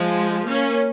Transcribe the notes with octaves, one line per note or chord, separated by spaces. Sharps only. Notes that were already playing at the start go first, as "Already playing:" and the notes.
Already playing: F3 G#3
A#3 C#4